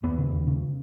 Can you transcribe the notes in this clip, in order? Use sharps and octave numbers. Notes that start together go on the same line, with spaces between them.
D#2 B3
C#3
D#2
C#3